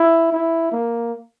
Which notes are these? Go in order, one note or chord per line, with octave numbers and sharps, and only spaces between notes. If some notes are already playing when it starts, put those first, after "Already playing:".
Already playing: E4
E4
A#3